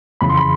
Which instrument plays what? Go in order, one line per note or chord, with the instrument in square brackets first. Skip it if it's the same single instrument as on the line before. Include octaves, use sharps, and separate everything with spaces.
[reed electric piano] F2 C#3 E3 B5
C6
B5